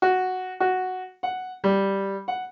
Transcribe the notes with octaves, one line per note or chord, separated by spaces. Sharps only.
F#4
F#4
F#5
G3
F#5